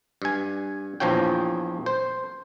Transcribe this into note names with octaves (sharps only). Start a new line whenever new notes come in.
G2 G#5
A#1 E2 F3 C#5 G5
C5